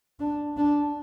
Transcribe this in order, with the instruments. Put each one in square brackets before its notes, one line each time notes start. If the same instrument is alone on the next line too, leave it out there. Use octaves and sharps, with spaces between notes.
[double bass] D4
D4